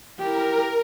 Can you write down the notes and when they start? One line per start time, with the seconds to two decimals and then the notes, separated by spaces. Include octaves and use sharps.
0.19 E4 G4 A#4